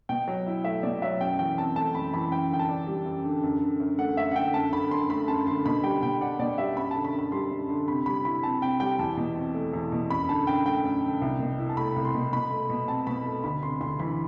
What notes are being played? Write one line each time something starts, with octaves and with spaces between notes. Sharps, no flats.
B2 G5
F#3
E4
A3 E5
B2 D5
F#3 E5
F#2 G5
E3 G5
C4 A5
A3 A5
F#2 B5
E3 B5
F#2 G5
D3 G5
A5
D4
G3
F#2
D3
F#2
D3
F#2
A3 F#5
F#2 E5
F#5
D3 G5
F#2 A5
D3 B5
F#2 C6
A3 B5
F#2 A5
D3 C6
B2 B5
G3 G5
B2 G5
D4 F#5
B2 D5
G3 E5
F#2 B5
D3 A5
B5
F#2
B5
G3 C6
F#2
D3
C3 B5
G3 B5
E4 B5
C4 A5
C3 G5
G3 G5
E2 A5
B2
C4
A3
E2
B2
F#2 B5
D3 A5
F#2 G5
A3 G5
F#2
D3
C2
B2
E4
A5
A3 B5
C2
C6
B2
B2 B5
A3
B2
C4 A5
B2 B5
A3
D2 B5
C3 C6
D2 C6
E3 B5